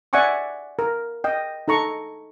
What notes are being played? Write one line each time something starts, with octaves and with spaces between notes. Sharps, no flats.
D5 E5 F#5 G#5 C#6 D6
A#4
D#5 G5
D#4 A4 A#5 C#6